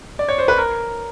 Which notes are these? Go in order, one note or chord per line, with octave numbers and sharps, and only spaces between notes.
D5
C#5
C5
B4
A#4